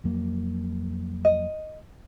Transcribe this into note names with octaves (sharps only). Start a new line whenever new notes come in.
F2 F#3 A#3
D#5